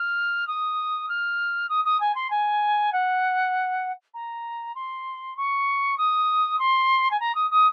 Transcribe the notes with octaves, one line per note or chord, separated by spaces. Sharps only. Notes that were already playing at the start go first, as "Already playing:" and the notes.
Already playing: F6
D#6
F6
D#6
D#6
G#5
C6
G#5
F#5
A#5
C6
C#6
D#6
C6
G#5
A#5
D#6
D#6